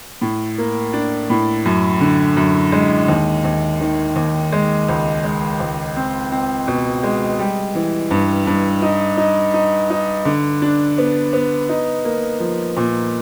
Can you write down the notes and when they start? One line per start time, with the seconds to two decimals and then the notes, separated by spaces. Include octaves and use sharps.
0.21 A2
0.58 A#3
0.94 D4
1.30 A2
1.65 F#2
2.01 D3
2.37 F#2
2.72 G#3
3.08 D#2
3.44 D#2
3.80 D#3
4.16 D#2
4.52 G#3
4.88 C#2
5.24 G#3
5.60 C#2
5.96 C4
6.32 C4
6.68 B2
7.03 G#3
7.39 G3
7.75 E3
8.11 G2
8.47 G2
8.82 D#4
9.17 D#4
9.54 D#4
9.90 D#4
10.25 D3
10.62 D4
10.98 B3
11.33 B3
11.69 D#4
12.05 A#3
12.40 F3
12.77 A#2